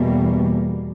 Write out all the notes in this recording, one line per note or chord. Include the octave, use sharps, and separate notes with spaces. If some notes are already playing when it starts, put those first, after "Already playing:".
Already playing: E2 B2 G3 A#3